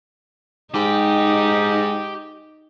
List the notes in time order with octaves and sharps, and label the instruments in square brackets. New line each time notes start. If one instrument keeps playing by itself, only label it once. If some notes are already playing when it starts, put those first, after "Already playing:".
[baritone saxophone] G#2 [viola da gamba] D#4 [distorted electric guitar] G4